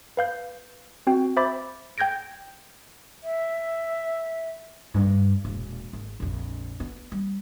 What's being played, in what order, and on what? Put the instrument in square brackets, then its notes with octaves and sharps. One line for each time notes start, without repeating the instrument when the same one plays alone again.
[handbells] B4 F5 G6
C4 F#4 G5
C5 E5 B5 D6 A6
G5 G6 G#6 A#6 D7
[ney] E5
[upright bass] G2
E1 A#2
G#1
A#1 F2
B3
G3